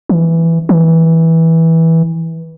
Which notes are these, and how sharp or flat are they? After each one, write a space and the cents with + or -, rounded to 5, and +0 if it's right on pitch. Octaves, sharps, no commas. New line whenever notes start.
E3 +5
E3 -15